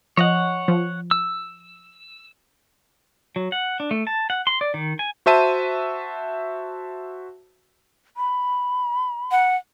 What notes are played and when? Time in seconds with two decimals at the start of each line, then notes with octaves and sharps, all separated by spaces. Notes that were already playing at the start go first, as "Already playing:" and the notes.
0.17 F3 C#5 D#5 F#5
0.68 F3
1.11 E6
3.36 F#3
3.52 F#5
3.80 D4
3.91 A3
4.07 A5
4.30 F#5
4.47 C6
4.61 D5
4.74 D#3
4.99 G#5
5.26 F#4 C5 E5 A5 D#7
8.17 B5
9.31 F#5